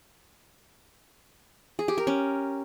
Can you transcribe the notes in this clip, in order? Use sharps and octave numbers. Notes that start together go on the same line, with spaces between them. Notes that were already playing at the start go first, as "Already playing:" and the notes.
G#4
G4
A#4
C#4